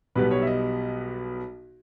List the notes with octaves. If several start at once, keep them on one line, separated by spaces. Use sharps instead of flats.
B1 B2 G3 B3 B4
C#5
E5
D#5